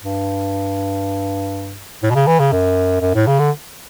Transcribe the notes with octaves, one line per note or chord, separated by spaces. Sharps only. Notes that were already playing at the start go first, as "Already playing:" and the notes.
G2
A2
B2
C#3
E3
C#3
F#2
F#2
A2
C#3
D3